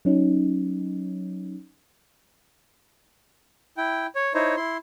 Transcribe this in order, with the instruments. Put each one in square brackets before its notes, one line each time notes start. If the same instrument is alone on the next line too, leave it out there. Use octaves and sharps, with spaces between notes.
[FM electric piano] F#3 C#4 D#4
[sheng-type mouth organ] E4 G5
C#5
D#4 E4 C5 C#5
E4 C6